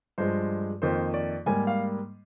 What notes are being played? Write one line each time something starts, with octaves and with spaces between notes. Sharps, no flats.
G2 F3 G#3 C5
F2 D#3 A#3 C5
D5
G#2 G3 A#3 G#5
F5